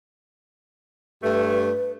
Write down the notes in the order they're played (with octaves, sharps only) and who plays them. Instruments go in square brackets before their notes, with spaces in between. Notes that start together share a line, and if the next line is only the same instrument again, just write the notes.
[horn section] G2 A3 [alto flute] B4